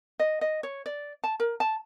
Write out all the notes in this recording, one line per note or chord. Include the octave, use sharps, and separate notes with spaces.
D#5
D#5
C#5
D5
A5
A#4
A5